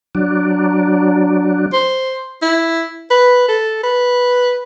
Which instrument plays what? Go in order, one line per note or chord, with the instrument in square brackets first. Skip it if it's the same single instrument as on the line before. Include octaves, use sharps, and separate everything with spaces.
[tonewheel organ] F#3 D4
[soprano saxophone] C5
E4
B4
A4
B4